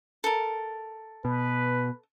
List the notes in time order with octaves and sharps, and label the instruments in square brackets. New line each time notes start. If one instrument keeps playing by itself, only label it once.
[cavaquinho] A4 A#4
[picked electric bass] B2 [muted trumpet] B4